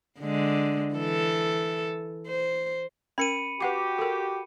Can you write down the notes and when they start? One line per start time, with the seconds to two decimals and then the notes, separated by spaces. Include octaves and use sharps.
0.20 D3 G#3
0.94 E3 A4
2.27 C5
3.18 C#4 A#4 B5 C#7 D#7
3.60 F#4 G4 B4 F#5 D6
3.98 A4 A#4